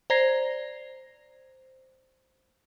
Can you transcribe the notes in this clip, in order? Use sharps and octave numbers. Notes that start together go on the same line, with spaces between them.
C5 D5 A#5 G#6 A#6 C7